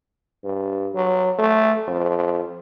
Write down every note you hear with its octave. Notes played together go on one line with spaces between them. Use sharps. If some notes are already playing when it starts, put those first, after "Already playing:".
G2
F#3
A3
F2